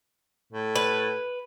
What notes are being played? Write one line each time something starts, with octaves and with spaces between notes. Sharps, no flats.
A2
B4